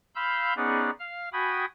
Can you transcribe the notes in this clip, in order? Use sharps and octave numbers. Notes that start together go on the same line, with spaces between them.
F5 B5 C6 E6 G6
B3 C#4 D#4 G#4 D5 F#5
F5 F6
F#4 G5 G#5 B5 D#6